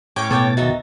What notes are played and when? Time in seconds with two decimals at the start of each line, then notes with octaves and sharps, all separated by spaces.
0.16 A2 C#4 C#5 G5 D6
0.31 B2 B3 A4 C#5 G5 A6
0.57 D#2 D#4 F#4 E5 A#5